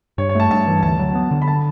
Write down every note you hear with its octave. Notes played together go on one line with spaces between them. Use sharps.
G2 C#5
C#5
A3 A5
G2 A5
E3
D2 A5
F#3
B3
D3
B5
A5